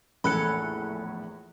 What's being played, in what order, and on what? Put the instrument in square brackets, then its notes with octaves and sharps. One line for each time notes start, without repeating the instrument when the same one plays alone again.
[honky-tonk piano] A#1 E2 A2 [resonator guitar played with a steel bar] C#4 A4 [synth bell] B5 F#6 C#7